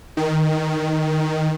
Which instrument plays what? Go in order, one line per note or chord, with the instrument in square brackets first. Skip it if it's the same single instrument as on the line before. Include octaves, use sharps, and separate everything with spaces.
[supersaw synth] D#3